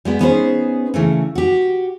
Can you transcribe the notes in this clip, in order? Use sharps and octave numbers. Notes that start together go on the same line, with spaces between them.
G3 G#3 B3
B3 C#4 D#4 G#4 A#4 C5
C#3 E3 A3 C#4
F#4 G4